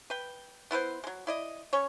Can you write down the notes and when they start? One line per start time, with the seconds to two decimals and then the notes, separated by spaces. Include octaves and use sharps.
0.10 B4 G5
0.71 B3 E4 B4 C5
1.04 F#3 G#3
1.27 E4 D5 D#5
1.73 C#4 C#5